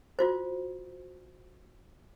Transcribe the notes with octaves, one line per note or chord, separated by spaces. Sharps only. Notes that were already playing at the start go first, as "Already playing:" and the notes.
F4 F#4 C5